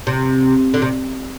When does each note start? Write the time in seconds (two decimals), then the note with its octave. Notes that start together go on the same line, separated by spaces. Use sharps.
0.07 C3
0.74 D3
0.82 C3